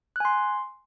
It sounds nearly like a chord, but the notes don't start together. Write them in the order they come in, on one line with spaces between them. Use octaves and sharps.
F#6 G#5 C6